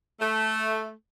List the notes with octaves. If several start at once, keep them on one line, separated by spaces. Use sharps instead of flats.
A3